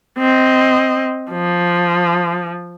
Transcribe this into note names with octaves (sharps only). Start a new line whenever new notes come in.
C4 D#5
F3